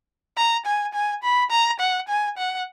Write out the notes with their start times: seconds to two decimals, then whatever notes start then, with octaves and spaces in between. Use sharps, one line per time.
0.37 A#5
0.66 G#5
0.94 G#5
1.23 B5
1.51 A#5
1.80 F#5
2.09 G#5
2.38 F#5